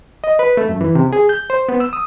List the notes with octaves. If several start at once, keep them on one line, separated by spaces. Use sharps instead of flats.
D#5
B4
A3
F#2
E3
C3
G#4
G6
C5
B3
E6
D#6